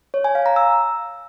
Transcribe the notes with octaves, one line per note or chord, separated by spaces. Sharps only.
C#5
G#5
F5
A#5
E6